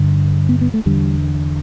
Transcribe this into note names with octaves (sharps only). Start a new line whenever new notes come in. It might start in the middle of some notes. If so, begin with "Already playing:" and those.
Already playing: G2 D3
B3
B3
A3
E2 D3 G3